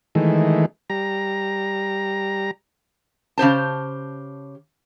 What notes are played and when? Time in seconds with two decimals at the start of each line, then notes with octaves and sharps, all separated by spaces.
0.15 D#3 E3 G#3 A3
0.90 G3 A#5
3.38 C#3 G4 C5 A5